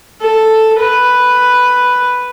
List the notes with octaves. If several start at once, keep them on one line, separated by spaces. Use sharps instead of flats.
A4
B4